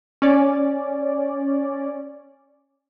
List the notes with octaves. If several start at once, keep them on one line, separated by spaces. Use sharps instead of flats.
C#4 D5